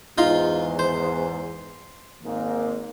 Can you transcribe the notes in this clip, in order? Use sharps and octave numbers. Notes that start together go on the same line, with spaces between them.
E2 G#2 D#4 F4 C6
C5
G#1 G#2 A#3